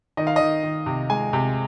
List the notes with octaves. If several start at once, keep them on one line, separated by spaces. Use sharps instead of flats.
D#3 D#5
F5
D#3 D#5
D#3
C3
G#3 G#5
C3